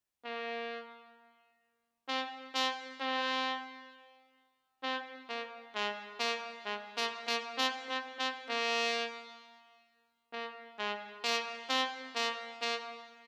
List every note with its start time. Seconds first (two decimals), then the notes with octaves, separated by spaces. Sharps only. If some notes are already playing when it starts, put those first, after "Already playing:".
0.25 A#3
2.08 C4
2.55 C4
3.01 C4
4.83 C4
5.29 A#3
5.75 G#3
6.20 A#3
6.66 G#3
6.97 A#3
7.27 A#3
7.58 C4
7.89 C4
8.19 C4
8.50 A#3
10.33 A#3
10.79 G#3
11.24 A#3
11.69 C4
12.15 A#3
12.62 A#3